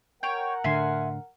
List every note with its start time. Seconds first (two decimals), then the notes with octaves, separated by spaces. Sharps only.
0.23 A#4 C#5 F#5 G5
0.64 A2 D3 E5 G#5 C6